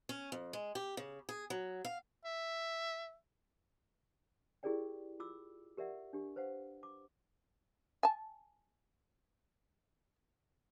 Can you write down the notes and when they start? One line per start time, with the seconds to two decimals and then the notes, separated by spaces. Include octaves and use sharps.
0.09 C#4
0.32 F2
0.53 G#3
0.75 G4
0.97 C#3
1.29 G#4
1.50 F#3
1.85 F5
2.25 E5
4.63 E4 G4 G#4 A#4 D5 G5
5.19 F4 D6 E6
5.77 G4 A#4 D5 E5 F#5
6.13 D4 G4
6.36 B4 C5 F5 F#5
6.83 D6
8.03 G#5 A5